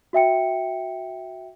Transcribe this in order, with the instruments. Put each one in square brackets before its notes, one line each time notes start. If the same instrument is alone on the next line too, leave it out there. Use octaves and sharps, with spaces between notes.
[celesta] F#4 E5 G5 C#7